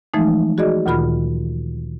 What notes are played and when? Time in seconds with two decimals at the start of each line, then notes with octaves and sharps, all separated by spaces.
0.14 E3 F3 G#3 A3 D#4
0.58 F#4 G#4 D5 D#5
0.86 D2 A#2 D#3 F4 B5 F6